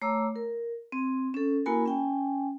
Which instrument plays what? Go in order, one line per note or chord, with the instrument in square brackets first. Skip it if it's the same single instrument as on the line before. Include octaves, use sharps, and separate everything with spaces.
[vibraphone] A3 C#5 A#5 D6 E6
A#4
C4
C#4 A4
A#3 E4 F#4 A#4 G#5 B5
C#4 G5 G#5